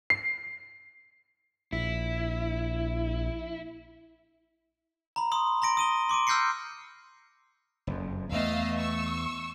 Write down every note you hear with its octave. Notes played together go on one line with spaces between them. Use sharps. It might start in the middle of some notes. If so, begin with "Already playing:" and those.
C7
A#1 E4
A#5 B5
B5 C6 D#6
A#5 C6 A#6 D7
D#6 D#7 G7
C6 D6 D7 D#7
E6 F6 G6 A#6 C7 C#7
F#1 F2
E2 A3 B3 D#5 F5 E6
C#6 E6